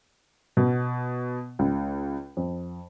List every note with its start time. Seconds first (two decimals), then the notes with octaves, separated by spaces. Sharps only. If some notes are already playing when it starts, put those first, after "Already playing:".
0.57 B2
1.59 C#2
2.37 F2